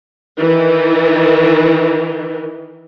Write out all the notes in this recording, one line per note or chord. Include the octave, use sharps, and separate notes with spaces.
D#3 E3